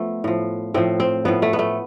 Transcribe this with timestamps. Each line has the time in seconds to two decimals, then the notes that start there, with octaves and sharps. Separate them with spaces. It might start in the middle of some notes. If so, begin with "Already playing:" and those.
Already playing: F3 A3 B3
0.24 A2 F3
0.74 A2 F3 C4
1.00 C4
1.25 A2 F3 B3
1.42 A3
1.53 B3
1.59 A3